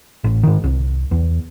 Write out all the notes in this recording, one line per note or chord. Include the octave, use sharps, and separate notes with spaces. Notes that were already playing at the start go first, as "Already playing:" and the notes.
A1
G#2 D#3
C2
E2